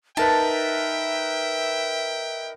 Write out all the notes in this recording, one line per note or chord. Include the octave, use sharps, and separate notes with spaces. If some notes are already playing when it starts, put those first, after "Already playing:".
D#4 A#4 B4 E5 G5 A5